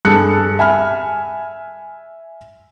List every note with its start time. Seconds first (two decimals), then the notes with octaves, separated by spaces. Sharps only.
0.05 G2 G#4 A4 A5 F#6 C#7
0.59 E5 G#5 B5 F6